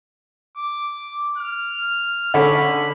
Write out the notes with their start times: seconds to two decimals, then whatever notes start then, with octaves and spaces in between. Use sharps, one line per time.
0.57 D6
1.38 F6
2.34 D3 C#4 B5